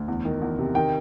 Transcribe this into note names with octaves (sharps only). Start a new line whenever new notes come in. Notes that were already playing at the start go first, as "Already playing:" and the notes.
Already playing: D2
E2
D#3
E2
C3
D#3 G5